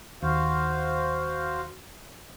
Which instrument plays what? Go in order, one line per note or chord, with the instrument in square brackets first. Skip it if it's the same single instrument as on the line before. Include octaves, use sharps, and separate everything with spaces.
[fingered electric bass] D#2 [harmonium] F#4 C5 F5